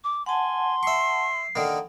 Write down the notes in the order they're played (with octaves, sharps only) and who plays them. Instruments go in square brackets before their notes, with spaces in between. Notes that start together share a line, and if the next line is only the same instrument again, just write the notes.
[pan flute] D6
[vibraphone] F#5 A5 [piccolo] G#5 [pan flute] C6
[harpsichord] E5 C#6 [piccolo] C7
[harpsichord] D3 D#3 A#3